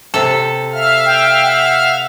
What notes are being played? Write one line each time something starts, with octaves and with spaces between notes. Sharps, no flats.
C3 A4
E5 F5 F6
G5
F#5